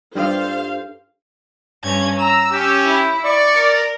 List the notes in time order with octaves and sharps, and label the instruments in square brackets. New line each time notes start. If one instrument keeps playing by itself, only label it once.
[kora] G2 F4 G4 [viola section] A4 C5 F5
[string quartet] G2 C#4 G#6
[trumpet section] A#5 [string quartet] E6
[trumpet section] C#4 G4
[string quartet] E4
[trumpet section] D5 [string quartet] C#6
[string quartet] A#4